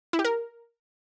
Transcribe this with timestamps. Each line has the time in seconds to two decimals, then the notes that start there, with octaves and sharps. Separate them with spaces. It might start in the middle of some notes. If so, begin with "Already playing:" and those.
0.13 E4
0.19 G4
0.25 A#4